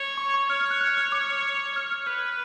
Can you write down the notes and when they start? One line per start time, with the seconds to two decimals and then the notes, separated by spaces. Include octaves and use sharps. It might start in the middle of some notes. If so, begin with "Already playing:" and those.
Already playing: C#5
0.17 C#6
0.34 C#6
0.50 C#5 F6
0.60 F6
0.71 F#6
0.81 F#6
0.97 F6
1.12 D6
1.76 C#5 F6
1.91 F6
2.06 B4 F6